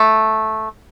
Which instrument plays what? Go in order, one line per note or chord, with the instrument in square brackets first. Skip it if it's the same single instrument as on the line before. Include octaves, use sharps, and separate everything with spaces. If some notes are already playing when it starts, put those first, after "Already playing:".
Already playing: [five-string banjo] A3